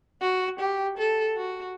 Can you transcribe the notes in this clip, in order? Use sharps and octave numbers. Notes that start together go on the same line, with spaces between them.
F#4
G4
A4
F#4